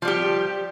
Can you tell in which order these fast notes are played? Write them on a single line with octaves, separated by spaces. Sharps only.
F3 G3 G4